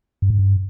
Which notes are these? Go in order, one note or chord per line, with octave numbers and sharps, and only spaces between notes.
G2
G#2
G2